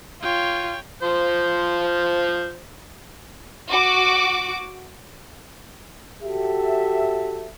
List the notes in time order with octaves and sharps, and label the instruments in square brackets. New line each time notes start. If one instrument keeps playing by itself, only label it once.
[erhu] F4 [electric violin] C#5 G5
[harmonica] F3 C5
[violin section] F#4 D6
[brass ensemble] F#4 G4 A4 E5